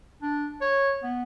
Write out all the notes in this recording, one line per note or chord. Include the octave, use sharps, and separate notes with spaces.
D4
C#5
B3